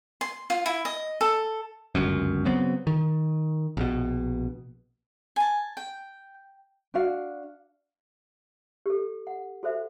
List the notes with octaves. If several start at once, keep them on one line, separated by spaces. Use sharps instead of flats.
C6
F4
E4
D#5
A4
G1 C#2 F#2
C#3 F#3 B3 C4
D#3
A#1 B2
G#5 A5
G5
D4 F#4 F5
G4 A4
F#5
F#4 A4 C5 E5